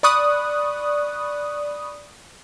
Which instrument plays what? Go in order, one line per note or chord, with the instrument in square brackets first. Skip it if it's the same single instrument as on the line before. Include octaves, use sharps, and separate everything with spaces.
[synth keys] D5 B5 C#6 D#6 F#6